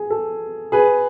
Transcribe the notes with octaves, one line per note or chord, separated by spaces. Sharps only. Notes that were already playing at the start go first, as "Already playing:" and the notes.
Already playing: G#4
A4
G#4 B4